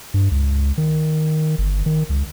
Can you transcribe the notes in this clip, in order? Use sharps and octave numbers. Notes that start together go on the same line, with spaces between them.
G2
C#2
D#3
G1
D#3
C#2